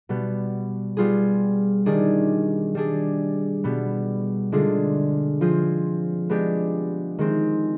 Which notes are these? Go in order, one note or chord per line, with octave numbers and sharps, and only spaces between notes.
B2 G3 B3
G3 B3 F4 G#4
D#3 G3 D4 G#4
G3 D4 G#4
B2 G3 B3
D3 G#3 D4 F4 G#4
F3 C4 F4 G#4
G#3 B3 D4 G4
D#3 G#3 C4